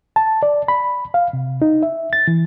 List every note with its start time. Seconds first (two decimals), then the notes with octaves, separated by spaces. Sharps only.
0.16 A5
0.43 D5
0.68 B5
1.14 F5
1.33 C3
1.62 D#4
1.83 E5
2.13 A6
2.28 E3